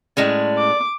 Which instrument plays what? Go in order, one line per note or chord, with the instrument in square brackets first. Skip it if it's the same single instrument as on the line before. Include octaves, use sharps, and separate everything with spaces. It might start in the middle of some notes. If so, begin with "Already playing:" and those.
[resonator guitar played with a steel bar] A2 G#3 C#4 [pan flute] D5
[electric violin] D6